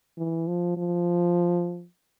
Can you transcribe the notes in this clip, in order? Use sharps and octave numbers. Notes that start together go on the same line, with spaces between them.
E3
F3
F3